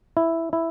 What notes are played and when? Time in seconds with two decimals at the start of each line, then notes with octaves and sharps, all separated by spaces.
0.17 E4
0.53 E4